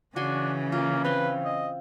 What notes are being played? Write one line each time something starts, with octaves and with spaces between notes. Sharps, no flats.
C#3 E3 D4 F#4 G#5 C6
A#3 F4
C4 B4 F5 C6
D#5